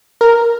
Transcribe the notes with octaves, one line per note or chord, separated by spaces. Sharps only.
A#4